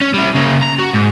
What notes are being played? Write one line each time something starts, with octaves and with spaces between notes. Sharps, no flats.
C#4
G3 E4
C#3 A#3
A#5
F#4
G#2